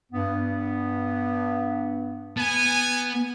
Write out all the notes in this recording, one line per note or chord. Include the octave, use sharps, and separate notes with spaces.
G2 B3
B3 G#5